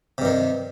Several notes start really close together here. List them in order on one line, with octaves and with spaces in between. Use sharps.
C3 G2 D#3